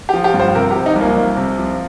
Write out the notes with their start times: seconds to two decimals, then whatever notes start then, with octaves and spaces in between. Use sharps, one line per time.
0.09 G4
0.13 F3
0.24 G4
0.34 G2
0.40 C5
0.55 C3 A#4
0.71 G4
0.75 F3
0.86 D#4
0.96 C2
1.01 A#3
1.16 C2
1.37 C3
1.58 F3